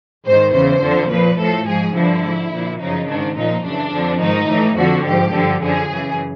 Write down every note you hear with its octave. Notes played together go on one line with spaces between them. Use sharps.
G#2 D#3 C5
E2 C#3 E3 C5
F2 D3 F3
A#2 F3 B4
A2 F3 A4
G#2 F3 G#4
G2 D3 F3 E4
G#2 F3
A#2 F3
F#2 C#3 F3 D#4
G#2 D#3 D4
A#2 F3 D#4
F#2 C#3 E3 D4
F2 D3 F3
G#2 D#3 D#4
A2 E3
F2 D3 F3 F#4
G#2 F3 G4
G2 D3 F3
F#2 D3 F3 G#4
F#2 C#3 E3